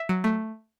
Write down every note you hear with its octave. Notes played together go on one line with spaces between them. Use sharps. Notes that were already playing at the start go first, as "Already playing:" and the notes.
Already playing: E5
F#3
A3